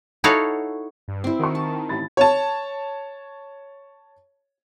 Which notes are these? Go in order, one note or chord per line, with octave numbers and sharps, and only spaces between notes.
D#4 E4 F#4 A4 C#5 F5
G2
C4 E4
D#3 F#4 C#6
A5
A1 B5 A6
C#5 A5